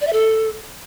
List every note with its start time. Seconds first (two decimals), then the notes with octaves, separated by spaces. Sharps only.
0.01 D5
0.07 E5
0.13 A4